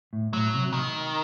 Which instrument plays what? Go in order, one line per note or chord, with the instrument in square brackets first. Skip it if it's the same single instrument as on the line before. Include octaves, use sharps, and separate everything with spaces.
[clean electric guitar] A2
[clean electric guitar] A2 [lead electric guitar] F#3
[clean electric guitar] C3
[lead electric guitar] D#3